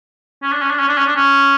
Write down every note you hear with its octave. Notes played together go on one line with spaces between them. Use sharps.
C#4
D4
C#4
D4
C#4
D4
C#4
D4
C#4